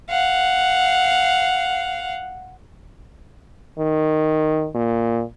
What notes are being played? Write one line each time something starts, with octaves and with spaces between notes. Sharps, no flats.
F5 F#5
D#3
A#2